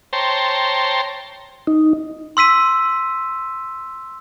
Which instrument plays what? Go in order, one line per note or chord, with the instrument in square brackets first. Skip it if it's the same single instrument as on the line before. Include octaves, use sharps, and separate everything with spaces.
[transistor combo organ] C5 C#5 G5 A5 A#5 C6
[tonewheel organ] D#4
[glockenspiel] C6 E6 B6 D#7